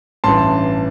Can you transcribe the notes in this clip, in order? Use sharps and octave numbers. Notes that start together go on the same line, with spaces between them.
A1 G2 E3 A5 C6